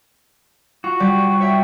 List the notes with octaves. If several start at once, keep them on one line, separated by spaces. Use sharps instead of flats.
F4 F#4
G3 D5
C#5 E5 G5